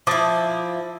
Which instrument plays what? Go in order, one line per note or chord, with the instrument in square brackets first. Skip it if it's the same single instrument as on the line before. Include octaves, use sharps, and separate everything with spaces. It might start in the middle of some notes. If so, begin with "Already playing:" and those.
[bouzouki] F3 E4 [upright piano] D6 D#6 A6